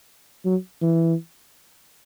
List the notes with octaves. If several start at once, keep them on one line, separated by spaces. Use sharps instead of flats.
F#3
E3